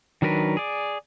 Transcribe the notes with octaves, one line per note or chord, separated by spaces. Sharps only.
D#3 F#3 D4 A#4 B4
G#4 D5